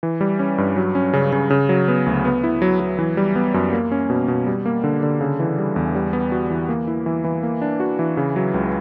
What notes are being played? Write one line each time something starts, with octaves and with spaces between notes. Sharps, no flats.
E3
G3
C#4
G2
F#3
C#4
C#3
C#3
C#3
F#3
B3
D2
B3
E4
F#3
F#3
E3
G3
B3
F#2
A#3
C#4
B2
B2
G3
A#3
D3
D3
C#3
E3
G3
E2
G3
B3
F#4
E3
A#3
E4
E3
E3
A#3
D4
F#4
E3
C#3
F#3
C#2